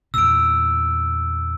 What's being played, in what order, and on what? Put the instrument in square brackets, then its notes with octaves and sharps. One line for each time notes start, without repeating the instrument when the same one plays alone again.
[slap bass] E2 A#2 [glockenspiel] E6 D7